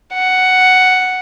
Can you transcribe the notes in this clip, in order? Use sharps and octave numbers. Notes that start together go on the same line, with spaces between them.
F#5